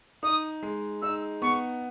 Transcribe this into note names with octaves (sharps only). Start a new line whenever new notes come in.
D#4 D#6
G#3
D#4 E6
B3 C#6